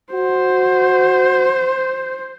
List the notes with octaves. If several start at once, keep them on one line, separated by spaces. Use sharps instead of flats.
F#4 C5